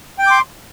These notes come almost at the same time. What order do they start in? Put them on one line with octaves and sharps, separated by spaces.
G5 G6 D6 C6